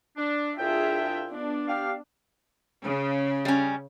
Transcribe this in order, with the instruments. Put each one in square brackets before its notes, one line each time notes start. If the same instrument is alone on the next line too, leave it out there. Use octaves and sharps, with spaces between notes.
[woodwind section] D4
[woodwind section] C2 D4 G5 [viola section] F4 G#4 E5
[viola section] B3 D4
[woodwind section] G4 F5
[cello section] C#3
[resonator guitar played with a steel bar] G3 C#4